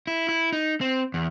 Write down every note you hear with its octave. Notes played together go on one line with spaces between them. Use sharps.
E4
E4
D#4
C4
E2